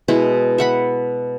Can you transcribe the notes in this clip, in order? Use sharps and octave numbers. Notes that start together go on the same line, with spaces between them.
B2 G#3 E4
E5 F#5 B5